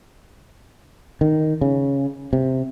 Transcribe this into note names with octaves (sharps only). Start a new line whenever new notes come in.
D#3
C#3
C3